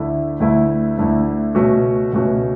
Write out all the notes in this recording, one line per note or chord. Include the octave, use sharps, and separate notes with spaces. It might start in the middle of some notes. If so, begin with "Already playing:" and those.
Already playing: D2 D3 A3 E4
D2 D3 A3 E4
D2 D3 A3 E4
C#2 B2 A3 C#4 F#4
C#2 B2 A3 C#4 F#4